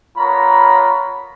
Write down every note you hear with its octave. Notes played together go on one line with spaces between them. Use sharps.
B3 F4 A#4 C#5 A#5 B5